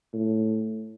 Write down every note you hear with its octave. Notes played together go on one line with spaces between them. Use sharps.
A2